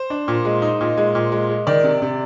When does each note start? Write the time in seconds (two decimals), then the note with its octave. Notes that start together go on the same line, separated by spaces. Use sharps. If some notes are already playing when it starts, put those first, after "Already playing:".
Already playing: C5
0.10 D4
0.28 A#2
0.45 G#3
0.62 D#4
0.81 A#2
0.97 G#3
1.15 A#2
1.32 G#3
1.50 G#3
1.67 D#3 D5
1.84 C3
2.02 C3